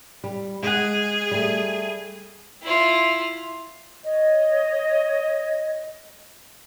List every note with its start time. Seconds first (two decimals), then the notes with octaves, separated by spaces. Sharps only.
0.24 G3
0.63 G#3 G#4 F#5
1.31 G3 A3
2.63 E4 F4
4.04 C#5 D#5